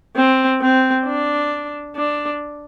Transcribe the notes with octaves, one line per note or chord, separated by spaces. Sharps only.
C4
C4
D4
D4